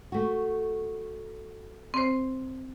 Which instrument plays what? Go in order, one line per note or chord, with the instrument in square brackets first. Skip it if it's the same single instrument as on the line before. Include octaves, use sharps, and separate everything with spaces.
[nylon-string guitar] A3 F#4
[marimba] C4 C5